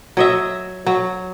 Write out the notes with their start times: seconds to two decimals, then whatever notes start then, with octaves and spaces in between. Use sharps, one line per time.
0.17 F#3 D#5 E5
0.86 F#3